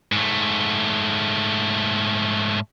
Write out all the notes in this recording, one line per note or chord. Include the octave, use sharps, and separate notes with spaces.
G#2 A3